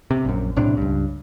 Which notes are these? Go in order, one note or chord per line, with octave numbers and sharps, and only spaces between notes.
C3
A#1 F#2
B1 A2 C3 D4
C#2 G2